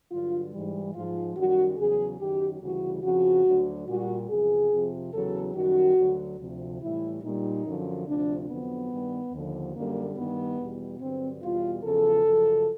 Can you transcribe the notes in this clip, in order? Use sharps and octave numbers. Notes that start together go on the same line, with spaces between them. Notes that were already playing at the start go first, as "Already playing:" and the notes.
G2 D3 F#3 F4
G#2 E3 G3
G#2 F3 F4
F#2 D#3 G3 F#4
E2 C#3 F#3 G#4
F#2 D#3 F#3 G4
D2 C#3 E3 G3 F#4
F2 C#3 F3 F#4
D2 D3 F#3
A#2 G3 F#4
E2 C3 F3 G#4
F2 C3 F3
E2 C#3 F#3 A4
F#2 D#3 G3 F#4
D2 D3 F#3
D2 C3 F3
A2 E3 G3 E4
A#2 G3 D#4
F#2 D3 F3
D2 C3 F3 D4
F2 D3 F#3 B3
G2 D#3 G3
D#2 D3 F3
F#2 D3 G3 A#3
G2 D#3 G3 B3
E2 B2 G3
G2 D3 F#3 C4
E2 B2 G3 F4
E2 C#3 F3 A4
F#2 C#3 F3